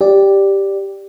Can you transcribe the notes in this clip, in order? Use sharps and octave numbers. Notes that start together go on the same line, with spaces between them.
G4 D5